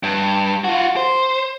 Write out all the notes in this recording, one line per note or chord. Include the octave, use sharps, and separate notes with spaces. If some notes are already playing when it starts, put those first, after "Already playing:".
G2
F4 F#4
C5